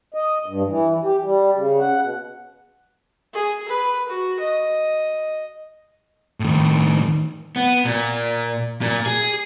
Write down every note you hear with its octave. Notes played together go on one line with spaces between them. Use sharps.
D#5
G2
E3
G4
G3
C#3
F#5
B2
G#4
B4
F#4
D#5
A2 D#3
B3
A#2
A#2
G#4